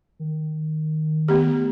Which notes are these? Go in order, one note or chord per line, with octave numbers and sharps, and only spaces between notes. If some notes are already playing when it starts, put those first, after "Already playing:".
D#3
A3 B3 G4